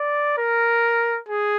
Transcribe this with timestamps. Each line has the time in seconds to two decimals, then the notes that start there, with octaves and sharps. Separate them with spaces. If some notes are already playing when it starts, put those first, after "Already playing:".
Already playing: D5
0.38 A#4
1.29 G#4